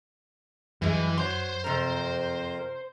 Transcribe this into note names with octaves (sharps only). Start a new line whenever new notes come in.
F#2 E3 G3 G#3
F#3 C5 C6
F2 C3 A#4 A#5